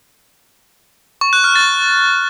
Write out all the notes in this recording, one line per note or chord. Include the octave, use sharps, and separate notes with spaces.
C#6
F#6
F6
A6